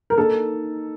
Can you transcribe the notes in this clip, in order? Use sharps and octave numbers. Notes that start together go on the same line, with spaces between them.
A#4
D#3 A#3 D#4 A4